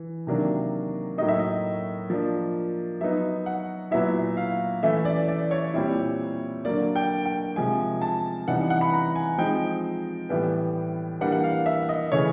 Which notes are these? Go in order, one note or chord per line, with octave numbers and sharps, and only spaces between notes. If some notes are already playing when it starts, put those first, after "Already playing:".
Already playing: E3
C3 D#3 F#3 A#3 D4
A2 F#3 A#3 D#4 D#5
E5
D#5
F3 A#3 D4
F#3 B3 D#4 E5
F#5
A#2 F#3 B3 E4 E5
F5
E3 A3 C#4 E4 E5
D5
D5
C#5
A#2 G3 C4 E4
D3 F#3 A#3 D5
G5
G5
C3 F3 G#3 G#5
A5
C3 E3 G3 B3 D#4 F#5
F#5
B5
A#5
G#5
F3 G#3 C4 D#4 G5
A2 E3 G3 B3
E3 G3 A#3 D4 F#5
F#5
F5
E5
D#5
C#3 E3 A3 C#5